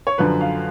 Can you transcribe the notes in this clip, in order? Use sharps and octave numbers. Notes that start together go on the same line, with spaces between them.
C#5
F#2 D3 F3 B4
F5